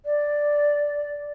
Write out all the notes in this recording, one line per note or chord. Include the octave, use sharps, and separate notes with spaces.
D5